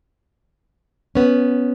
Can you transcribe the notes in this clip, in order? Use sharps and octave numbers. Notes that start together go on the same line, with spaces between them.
B3 C#4